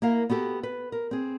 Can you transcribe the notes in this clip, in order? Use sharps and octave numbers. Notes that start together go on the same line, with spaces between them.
A#3 E4 A#4 F5
B3 F#4 G4 A4
B4
A#4
C4 G#4